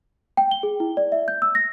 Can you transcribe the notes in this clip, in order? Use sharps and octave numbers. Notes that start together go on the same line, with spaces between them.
G5
G7
G#4
E4
D5
E5
G6
E6
A#6